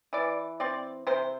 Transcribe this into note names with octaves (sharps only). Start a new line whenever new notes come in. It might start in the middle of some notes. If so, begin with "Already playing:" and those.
E3 D5
C4 D5
C3 C5